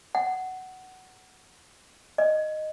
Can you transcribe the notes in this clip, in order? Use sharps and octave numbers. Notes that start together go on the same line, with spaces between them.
F#5
D#5